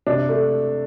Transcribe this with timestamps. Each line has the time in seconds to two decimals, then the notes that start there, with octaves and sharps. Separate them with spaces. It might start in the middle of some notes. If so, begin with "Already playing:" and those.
0.07 C3 D4
0.29 A3